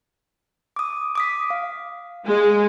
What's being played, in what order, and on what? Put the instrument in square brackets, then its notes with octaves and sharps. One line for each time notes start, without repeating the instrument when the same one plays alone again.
[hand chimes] D6 D#6
D6 D#6 B6
F5
[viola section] G#3